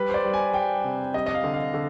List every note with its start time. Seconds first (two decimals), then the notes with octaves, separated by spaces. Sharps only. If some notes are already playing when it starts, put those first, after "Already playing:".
Already playing: G3 B4
0.09 C5
0.14 D5
0.24 G3
0.33 G#5
0.54 G3 G5
0.85 C3
1.14 G3 D#5
1.26 D#5
1.34 F5
1.44 D3
1.53 F5
1.74 D3